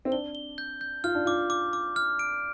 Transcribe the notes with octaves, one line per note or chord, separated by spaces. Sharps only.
C4
D4 G7
G7
G6
G6
F4 F6
D4
F4 D6
D6
D6
F6
D7